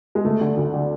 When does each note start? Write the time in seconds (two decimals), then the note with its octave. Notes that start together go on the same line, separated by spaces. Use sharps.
0.15 G#3
0.25 D2 A3
0.41 D3
0.57 D2
0.74 D3